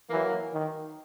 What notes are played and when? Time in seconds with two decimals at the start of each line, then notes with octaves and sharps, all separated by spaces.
0.10 E3 F#3 A#3
0.53 D#3